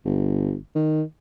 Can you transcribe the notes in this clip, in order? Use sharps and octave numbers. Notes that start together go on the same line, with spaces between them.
G1
D#3